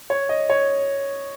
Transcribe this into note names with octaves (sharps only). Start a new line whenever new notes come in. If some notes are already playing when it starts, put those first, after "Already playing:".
C#5
D#5
C#5